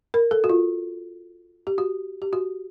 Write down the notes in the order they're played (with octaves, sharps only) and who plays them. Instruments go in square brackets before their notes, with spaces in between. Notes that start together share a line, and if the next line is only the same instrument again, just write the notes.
[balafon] A#4
A4
F#4
F4
G4
F#4
G4
F#4